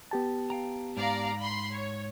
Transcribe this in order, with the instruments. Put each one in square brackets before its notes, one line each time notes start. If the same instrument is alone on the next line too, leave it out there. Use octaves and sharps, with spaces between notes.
[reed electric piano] B3 G4 A5
[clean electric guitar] F5 G5 A#5
[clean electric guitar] G#2 [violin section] D5 F5 A#5
[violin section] B5 C6
C#5